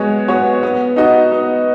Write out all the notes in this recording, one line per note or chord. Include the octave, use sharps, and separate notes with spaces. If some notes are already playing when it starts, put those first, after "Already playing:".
Already playing: G#3 B3 F#4 C#5
B3 F#4 C#5
B3
D#4 F#4 D#5
B3